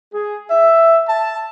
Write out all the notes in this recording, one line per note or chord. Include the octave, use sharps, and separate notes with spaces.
G#4
E5
A5